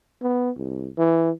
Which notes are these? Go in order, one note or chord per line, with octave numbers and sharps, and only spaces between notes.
B3
C2
E3